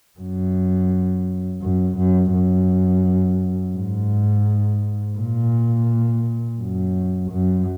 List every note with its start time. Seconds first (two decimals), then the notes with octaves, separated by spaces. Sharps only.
0.19 F#2
1.63 F#2
1.98 F#2
2.33 F#2
3.75 G#2
5.19 A#2
6.61 F#2
7.32 F#2